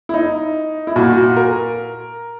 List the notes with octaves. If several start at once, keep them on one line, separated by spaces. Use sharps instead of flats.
E4
D#4
E4
A#2 F#4
F#4
A#4